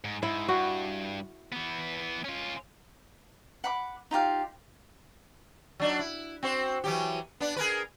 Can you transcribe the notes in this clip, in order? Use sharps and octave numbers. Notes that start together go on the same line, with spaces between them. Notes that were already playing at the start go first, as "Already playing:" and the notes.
G#2
G#2 E4
G2 F#4
E3 B3
C#4 F4
F#5 B5 D6
D#4 F4 G4 F5
F#3 D4 D#4
E4
C4 F#4 C5
E3 F#3 G4
B3 D4
G#4 A#4 B4